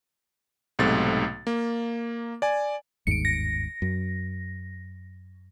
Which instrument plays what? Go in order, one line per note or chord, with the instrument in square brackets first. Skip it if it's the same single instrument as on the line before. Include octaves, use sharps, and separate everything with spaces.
[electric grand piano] B1 G#2 C3 A3 A6
A#3
D5 G#5
[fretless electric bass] G1 D#2 G#2 [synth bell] C#7 D7
[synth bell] A#6
[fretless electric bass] F#2